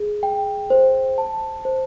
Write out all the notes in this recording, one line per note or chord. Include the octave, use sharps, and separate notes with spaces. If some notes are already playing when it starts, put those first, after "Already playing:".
Already playing: G#4
G5
C5
A5
C5